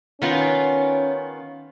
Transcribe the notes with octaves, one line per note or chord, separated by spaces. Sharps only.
D#3 B3 C#4 F4